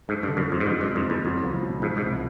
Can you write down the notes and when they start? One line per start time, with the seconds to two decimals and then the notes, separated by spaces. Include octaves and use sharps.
0.08 G#2 A3
0.23 G2
0.28 D3
0.37 F#2
0.47 F2 F3
0.60 G#2
0.66 G2 G#3
0.81 G2
0.86 C3
0.96 F2
1.06 E2 E3
1.25 F2 F#3
1.44 C#2
1.63 B2
1.82 G#2 F3
1.97 G#2
2.02 C2